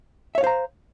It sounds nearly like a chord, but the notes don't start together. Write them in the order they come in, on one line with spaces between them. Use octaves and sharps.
E5 C#5 F5 C5 A#5